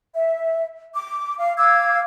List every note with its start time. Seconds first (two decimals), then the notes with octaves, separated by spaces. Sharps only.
0.15 E5
0.94 D6
1.39 F5
1.57 F5 D6 E6 G#6